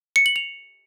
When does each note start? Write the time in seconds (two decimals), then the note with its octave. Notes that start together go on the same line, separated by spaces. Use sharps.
0.16 C#7
0.26 F#7
0.36 F7